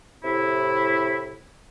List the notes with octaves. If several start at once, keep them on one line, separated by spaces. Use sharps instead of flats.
A2 C3 E4